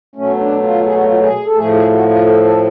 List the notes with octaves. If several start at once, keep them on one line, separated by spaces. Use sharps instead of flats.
B2 F#3 A3 C#4
D4
F4
G#4
F#4
F4
F#4
G#4
A4
A2 F3 A3 G#4
G#4
F#4
F4
A4
A4